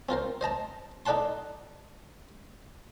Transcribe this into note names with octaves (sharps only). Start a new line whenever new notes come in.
C4 F4 A#4 C5
C5 D#5 A5 A#5
D#4 A4 D5 F#5 A5 C6